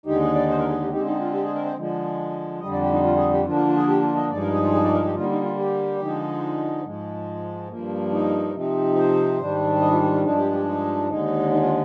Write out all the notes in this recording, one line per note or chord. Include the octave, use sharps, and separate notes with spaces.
D#2 D3 G#3 D#4 G4
G#4
D5
C5
A#4
G#4
G4
D3 G#3 C4 D#4 G4
D#4
F4
G4
G#4
A#4
C5
D3 F3 G#3
F2 D3 G3 D#5
D5
G4
D#4
F4
G#4
G4
D3 F3 A#3 D4 F4
F4
F4
G#4
G4
F4
D#5
G2 F3 G#3 D#4 D5
A#4
G#4
F4
G#4
D5
A#4
G4
D3 G3 A#3 D#4 F4
D#4
F4
G4
D3 F3 G#3 D#4
G#2 F3 G#3
G2 F3 A#3
D#4
C3 F3 C4 D#4
C5
G#2 D#3 G3 D4
D#5
F4
F4
F4
G2 F3 G#3 D4 D#4
G4
G4
D#4
D#2 D3 G#3 D#4
D#4
F4